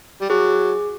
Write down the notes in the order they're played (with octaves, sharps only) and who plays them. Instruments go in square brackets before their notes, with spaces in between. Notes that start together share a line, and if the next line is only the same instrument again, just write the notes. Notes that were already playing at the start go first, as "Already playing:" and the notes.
[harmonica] G3
[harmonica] F#3 [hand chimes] G#4